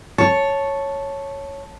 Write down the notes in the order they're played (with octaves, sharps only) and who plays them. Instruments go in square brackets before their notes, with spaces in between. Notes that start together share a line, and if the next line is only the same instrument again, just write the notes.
[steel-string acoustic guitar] C#5 [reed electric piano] A5